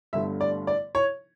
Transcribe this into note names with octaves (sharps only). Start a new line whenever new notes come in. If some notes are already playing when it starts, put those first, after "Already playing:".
G1 G2 D3 A3 E5
D5
D5
C#5